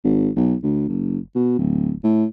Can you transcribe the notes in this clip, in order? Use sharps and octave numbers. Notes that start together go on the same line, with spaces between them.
G#1
B1
D2
F#1
B2
D1
A2